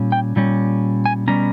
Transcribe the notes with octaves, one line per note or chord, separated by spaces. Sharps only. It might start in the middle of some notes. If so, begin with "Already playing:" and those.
Already playing: A#2 G3 C#4
G5
A#2 G3 C#4
G#5
B2 G3 C#4 A#5